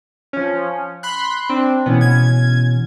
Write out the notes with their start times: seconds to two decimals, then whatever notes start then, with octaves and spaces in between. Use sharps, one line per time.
0.33 F3 C#4
1.03 B5 C6 F#6
1.50 C4 D4
1.86 B2 E3 B3 C#4
2.01 G#6